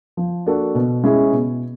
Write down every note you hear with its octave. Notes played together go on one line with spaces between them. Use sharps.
F3
A#3 D4 F#4 A4
B2
G#3 C#4 E4 G#4
B2